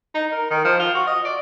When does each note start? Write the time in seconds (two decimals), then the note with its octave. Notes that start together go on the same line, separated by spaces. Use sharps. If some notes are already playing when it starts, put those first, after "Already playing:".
0.15 D#4
0.32 A#4
0.51 D#3
0.65 F3
0.79 F4
0.95 F#4
1.07 D#5
1.25 D5